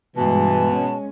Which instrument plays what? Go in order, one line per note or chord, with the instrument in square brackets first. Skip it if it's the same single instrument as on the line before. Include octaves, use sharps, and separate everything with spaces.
[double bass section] G2 G#3 [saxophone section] B2 [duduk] E3 [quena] A5
[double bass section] G#3 C#4